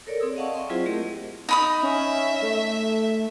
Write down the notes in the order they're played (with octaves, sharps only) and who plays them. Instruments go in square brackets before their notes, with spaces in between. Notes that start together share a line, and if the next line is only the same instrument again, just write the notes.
[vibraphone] A4 A#4 C#5 D5
C4 G#4 D#6 E6
D5 D#5 F5 F#5 A5 C#6
E5 G5 C6
F#3 C4 E4 F4 G#4 C5
A3 G4 A#4 D#5
[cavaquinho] D#4 B5 D#6
[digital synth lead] C#4 [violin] E5
[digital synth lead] A3